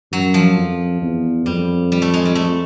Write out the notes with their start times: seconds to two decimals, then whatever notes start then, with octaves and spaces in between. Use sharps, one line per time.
0.12 F#2 F#3
0.34 F3
0.57 F2
1.02 E2
1.46 F2 G3
1.92 G3
2.02 A3
2.14 G#3
2.25 G3
2.35 A3